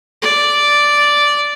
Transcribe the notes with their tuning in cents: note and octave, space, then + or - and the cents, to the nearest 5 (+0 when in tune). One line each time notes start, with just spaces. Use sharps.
D5 -5